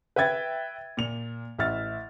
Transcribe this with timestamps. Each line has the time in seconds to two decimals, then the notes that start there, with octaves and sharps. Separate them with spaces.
0.16 B4 E5 G5 G#6 A6
0.97 A#2 F7
1.59 A1 E5 F6 A6